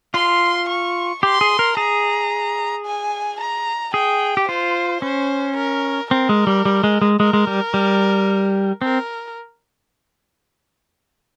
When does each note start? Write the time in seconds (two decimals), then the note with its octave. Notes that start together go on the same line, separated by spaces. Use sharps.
0.14 F4 C6
0.69 C#6
1.23 G4 C6
1.41 G#4
1.59 A#4
1.77 G#4 A#5
2.86 G#5
3.40 A#5
3.94 G#4 G5
4.37 G4
4.49 F4 C5
5.02 C#4 C5
5.57 A#4
6.11 C4 A#4
6.29 G#3
6.47 G3
6.65 G3
6.84 G#3
7.02 G#3
7.20 G#3 A#4
7.33 G#3
7.47 G3
7.74 G3
8.82 C4 A#4